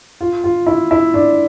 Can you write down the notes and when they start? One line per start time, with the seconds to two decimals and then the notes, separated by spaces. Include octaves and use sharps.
0.21 F4
0.44 F4
0.66 E4
0.91 E4
1.14 D4